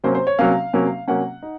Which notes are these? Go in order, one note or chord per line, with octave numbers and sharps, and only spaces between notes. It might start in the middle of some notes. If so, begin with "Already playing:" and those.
C3 F#3 A#3 C#4 C5
C5
C#5
C3 F#3 A#3 C#4 F5
C3 F#3 A#3 C#4
C3 F#3 A#3 C#4 F#5
D#4